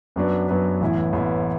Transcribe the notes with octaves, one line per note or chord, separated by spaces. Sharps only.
F#2 F#3 B3 D4 B4
F#2 F#3 B3 D4 B4
A1 A2 E3 B3 E4
A1 A2 E3 B3 E4